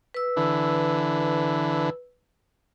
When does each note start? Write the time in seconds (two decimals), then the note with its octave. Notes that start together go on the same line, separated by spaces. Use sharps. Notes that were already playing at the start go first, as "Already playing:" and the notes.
0.14 B4 E6
0.37 D3 E3